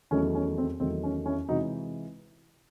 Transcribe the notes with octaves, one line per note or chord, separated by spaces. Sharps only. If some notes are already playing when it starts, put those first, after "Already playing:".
E2 D#3 F#3 A3 C#4
C#4
C4
E2 D#3 F#3 A3 C4
C#4
C#4 E4
C3 E3 G#3 D#4 F#4